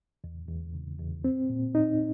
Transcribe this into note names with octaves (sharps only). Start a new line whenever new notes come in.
E2
E2
C#3
E2
C4
A#2
D#4